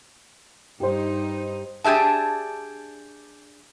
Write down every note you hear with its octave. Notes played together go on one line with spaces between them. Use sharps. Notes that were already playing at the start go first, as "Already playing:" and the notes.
G2 D#4 G4 C5
D4 G4 G#4 E5 A5